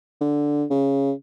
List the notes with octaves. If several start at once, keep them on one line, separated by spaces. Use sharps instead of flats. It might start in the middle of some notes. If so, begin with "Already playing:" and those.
D3
C#3